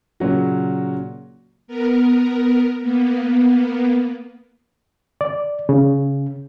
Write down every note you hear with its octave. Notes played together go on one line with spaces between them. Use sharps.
A#2 C#3 F#3 F#4
B3 A#4
A#3 B3
D5
C#3